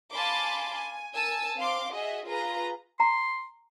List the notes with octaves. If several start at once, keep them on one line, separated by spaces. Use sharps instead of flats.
F5 G#5 A5 B5 C6 D6
G#5
A#4 G#5 A5 E6
C4 F5 C6 D6
F#4 G#4 D#5 E5
F4 G#4 B4 A#5
A#5 C6